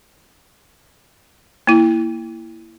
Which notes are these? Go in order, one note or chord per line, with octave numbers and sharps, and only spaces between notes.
A#3 E4